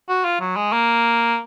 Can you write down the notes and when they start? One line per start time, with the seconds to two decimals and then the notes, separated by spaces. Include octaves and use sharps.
0.09 F#4
0.25 F4
0.40 F#3
0.56 G#3
0.73 A#3